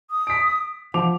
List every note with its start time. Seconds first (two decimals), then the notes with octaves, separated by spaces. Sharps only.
0.10 D#6
0.27 B6 D7
0.94 F3 F#5 D6 F7